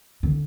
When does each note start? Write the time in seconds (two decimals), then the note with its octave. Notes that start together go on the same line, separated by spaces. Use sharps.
0.23 D3